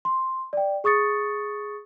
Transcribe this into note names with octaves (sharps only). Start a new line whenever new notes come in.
C6
D5 G5
G#4 C#6 D#6 A6 C#7